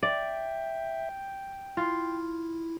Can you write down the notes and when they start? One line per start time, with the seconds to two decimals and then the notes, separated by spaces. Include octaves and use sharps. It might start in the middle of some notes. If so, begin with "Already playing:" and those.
0.03 D5 E5 G5
1.77 E4 F4